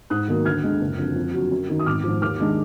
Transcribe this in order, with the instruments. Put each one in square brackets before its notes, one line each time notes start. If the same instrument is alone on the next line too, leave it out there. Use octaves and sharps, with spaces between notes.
[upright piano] G#2 D#6 F#6
D#3 F#3 A#3
D2 F6 G#6
D3 G#3
F#1
F2 D3
F2
D3 F#3
F#2
D#3 F#3
D#6
G#1 D6 F6
G#2 F3
D#2 D6 F6
D#3 G#3 D4